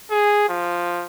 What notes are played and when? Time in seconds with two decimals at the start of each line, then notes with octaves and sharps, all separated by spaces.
0.11 G#4
0.49 F3